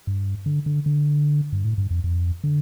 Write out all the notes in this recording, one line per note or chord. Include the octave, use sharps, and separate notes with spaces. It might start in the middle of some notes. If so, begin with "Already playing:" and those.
G2
D3
D3
D3
G2
A2
G2
F2
F2
D3